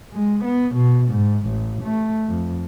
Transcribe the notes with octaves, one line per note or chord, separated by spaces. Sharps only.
G#3
B3
B2
G#2
A1
A3
F2